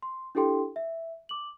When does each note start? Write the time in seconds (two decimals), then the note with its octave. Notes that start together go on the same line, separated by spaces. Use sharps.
0.02 C6
0.35 D4 E4 G4 A4 G5 C6
0.76 E5
1.29 D6 F#7